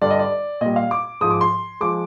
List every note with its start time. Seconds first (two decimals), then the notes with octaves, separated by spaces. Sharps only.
0.01 G2 D3 G3 D5
0.10 D#5
0.19 D5
0.61 A#2 G3 D#5
0.76 F5
0.91 D6
1.21 G#2 F3 G#3 D#6
1.31 D6
1.41 C6
1.80 F3 G#3 D6